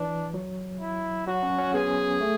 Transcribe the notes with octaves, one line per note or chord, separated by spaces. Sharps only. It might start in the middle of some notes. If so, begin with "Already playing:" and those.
Already playing: E3 D4
F#3
E4
F#3 F#4
C#4
C#4
B3 G#4
A3